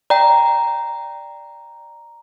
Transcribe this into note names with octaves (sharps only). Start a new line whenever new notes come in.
D5 G5 A#5